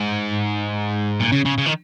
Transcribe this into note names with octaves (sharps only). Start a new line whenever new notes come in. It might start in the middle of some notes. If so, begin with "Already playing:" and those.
Already playing: G#2
A#2
C#3
C#3
C#3
D#3